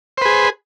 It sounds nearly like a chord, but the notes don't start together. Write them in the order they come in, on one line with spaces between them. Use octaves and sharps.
C5 B4 G#4